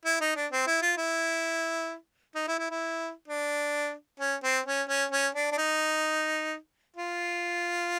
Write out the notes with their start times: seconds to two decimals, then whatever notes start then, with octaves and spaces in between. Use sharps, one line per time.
0.05 E4
0.21 D#4
0.36 D4
0.52 C4
0.67 E4
0.82 F4
0.97 E4
2.35 D#4
2.48 E4
2.59 E4
2.70 E4
3.28 D4
4.20 C#4
4.43 C4
4.66 C#4
4.89 C#4
5.12 C#4
5.35 D4
5.52 D4
5.58 D#4
6.96 F4